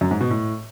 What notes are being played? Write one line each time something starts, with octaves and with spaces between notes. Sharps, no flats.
F#2
G#2
B2
A2